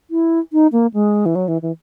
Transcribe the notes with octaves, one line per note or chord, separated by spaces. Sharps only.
E4
D#4
A#3
G#3
E3
F#3
E3
E3